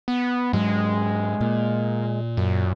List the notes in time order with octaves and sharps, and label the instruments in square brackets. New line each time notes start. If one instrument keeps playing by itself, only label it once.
[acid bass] B3
[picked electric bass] G#2 F#3 [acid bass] G#3
[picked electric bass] A#2
[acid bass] F#2